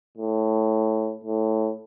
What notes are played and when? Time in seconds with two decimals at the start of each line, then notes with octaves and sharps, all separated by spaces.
0.17 A2
1.24 A2